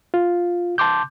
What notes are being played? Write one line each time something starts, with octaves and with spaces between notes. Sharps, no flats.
F4
A5 C6 D6 G6